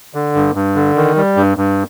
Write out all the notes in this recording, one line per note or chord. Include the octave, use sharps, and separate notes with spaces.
D3
G2
G2
D3
D#3
G3
G2
G2